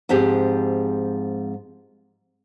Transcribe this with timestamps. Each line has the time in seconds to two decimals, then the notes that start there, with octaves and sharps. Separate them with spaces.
0.09 G#2 F3 C4 G4 G#4